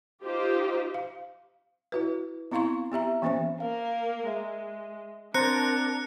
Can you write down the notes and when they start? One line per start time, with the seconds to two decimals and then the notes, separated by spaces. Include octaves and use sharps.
0.23 D#4 F4 G4 C5
0.94 F5
1.92 E4 F#4 B4
2.51 B3 C4 E4 F5 C6 C#6
2.92 B3 G4 E5 A#5
3.22 E3 A#3 B3 C#4 C5 E5
3.60 A#3 A#4 F5
4.27 G#3 E5
5.34 C4 D4 A#4 C5 A#5 F#6 A6 C#7